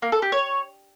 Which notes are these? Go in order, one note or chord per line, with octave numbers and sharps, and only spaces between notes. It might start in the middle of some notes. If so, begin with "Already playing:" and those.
A#3
A4
G4
C#5